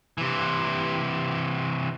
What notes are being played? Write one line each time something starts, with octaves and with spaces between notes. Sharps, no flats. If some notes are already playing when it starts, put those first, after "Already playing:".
C3 E3